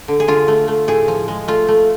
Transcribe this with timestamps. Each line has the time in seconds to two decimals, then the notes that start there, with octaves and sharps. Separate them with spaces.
0.08 D3
0.20 G#4
0.28 D3 F4
0.48 A3
0.68 A3
0.88 A2 G#4
1.08 F3
1.28 G#3
1.48 A3 F4
1.68 A3